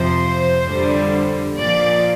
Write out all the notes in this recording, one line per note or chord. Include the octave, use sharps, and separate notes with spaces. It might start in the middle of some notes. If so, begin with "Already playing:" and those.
Already playing: F2 C3 F3 C5
F2 D3 G3
A#2 F3 D5